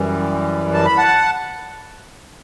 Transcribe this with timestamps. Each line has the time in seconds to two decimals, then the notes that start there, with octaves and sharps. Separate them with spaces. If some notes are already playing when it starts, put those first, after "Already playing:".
Already playing: F#2 E3 G3
0.74 A5
0.85 B5
0.97 F#5 A5